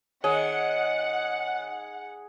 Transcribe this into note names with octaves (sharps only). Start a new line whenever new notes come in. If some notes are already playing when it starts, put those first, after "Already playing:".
D#3 G#4 C#5 F#5